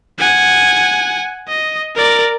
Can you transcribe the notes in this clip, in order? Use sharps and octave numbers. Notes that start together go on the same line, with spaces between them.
F#5 G#5
D#5
A#4 D5